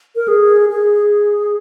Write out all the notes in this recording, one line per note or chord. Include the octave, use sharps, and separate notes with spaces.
A#4
G#4
G#4